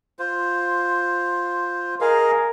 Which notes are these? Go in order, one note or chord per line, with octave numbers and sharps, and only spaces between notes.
F4 C5
G#4 A#4 D#5 F5